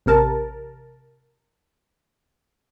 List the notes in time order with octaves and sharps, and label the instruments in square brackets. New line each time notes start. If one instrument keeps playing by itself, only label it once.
[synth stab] A1 C3 A#4 A5